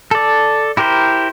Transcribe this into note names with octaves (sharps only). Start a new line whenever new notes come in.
A4 D5
E4 G4 A#4 C5